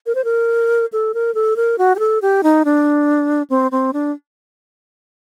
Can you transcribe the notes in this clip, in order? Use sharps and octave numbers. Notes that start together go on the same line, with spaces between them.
A#4
C5
A#4
A4
A#4
A4
A#4
F#4
G4
A4
G4
D#4
D4
C4
C4
D4